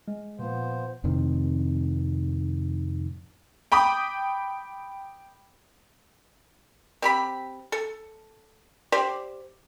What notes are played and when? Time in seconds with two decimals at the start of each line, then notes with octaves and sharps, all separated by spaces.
0.08 G#3
0.39 A#2 F3 B3 C5
1.04 F2 A2 C3 D#3
3.72 G5 B5 D6 D#6
7.02 C4 G4 B5
7.72 A4
8.92 G4 C5 D5